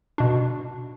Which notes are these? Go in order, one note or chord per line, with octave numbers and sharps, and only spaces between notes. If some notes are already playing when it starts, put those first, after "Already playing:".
B2 D4